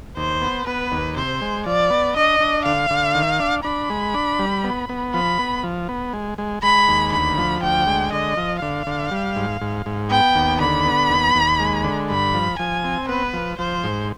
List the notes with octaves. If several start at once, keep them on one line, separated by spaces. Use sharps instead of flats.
D#2 C5
B3
B3 B4
D#2
C3 C5
G#3
F3 D5
B3
D4 D#5
D4
D3 F5
D3
D#3
D4
D4 B5
G#3
D4
G3
B3
B3
F3 B5
B3
F3
B3
G#3
G#3
G#3 B5
D#2
D2 B5
F3
D2 G5
G#3
D3 D#5
F3
D3 F5
D3
G3
G#2
G#2
G#2
B3 G5
D#2
D3 B5
B3
D#2
D#2
G#3
D3
G2 B5
F3
F3 G#5
C4
B3 B4
F3
F3 C5
G#2